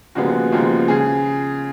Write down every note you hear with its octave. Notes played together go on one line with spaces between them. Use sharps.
D#2 C#3 F3 G#3 B3 F#4
D#2 C#3 F3 G#3 B3
C#3 G#4